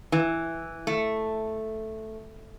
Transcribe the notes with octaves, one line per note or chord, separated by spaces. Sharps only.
E3
A3